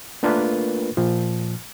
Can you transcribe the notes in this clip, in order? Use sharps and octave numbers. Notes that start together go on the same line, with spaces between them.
A3 A#3 D4 F4 A#4 B4
A#2 F3